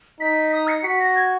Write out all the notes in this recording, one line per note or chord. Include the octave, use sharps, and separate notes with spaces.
D#4 B6
D#6
C#7
F#4 B6
A#6
G#6